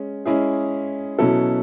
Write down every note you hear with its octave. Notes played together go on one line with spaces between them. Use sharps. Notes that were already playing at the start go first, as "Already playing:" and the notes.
Already playing: G#3 C#4
G#3 C#4 E4 G#4
B2 F#3 C#4 E4 A4